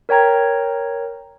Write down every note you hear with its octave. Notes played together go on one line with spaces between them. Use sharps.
A#4 C#5 G5 A#5 G#6